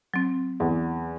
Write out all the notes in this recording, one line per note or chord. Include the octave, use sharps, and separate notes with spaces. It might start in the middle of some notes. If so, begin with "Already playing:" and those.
F#3 C4
E2